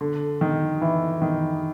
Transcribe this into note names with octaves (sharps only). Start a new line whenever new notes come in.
D3
D#3
E3
D#3